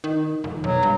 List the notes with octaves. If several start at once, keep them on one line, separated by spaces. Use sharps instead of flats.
D#3
F1
B1 F#3
G2